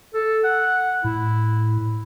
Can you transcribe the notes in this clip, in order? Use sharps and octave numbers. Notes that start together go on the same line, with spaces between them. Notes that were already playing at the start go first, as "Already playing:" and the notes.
A4
F#5
A2 E4